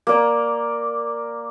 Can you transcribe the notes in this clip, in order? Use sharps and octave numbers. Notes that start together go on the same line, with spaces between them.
A#3 D5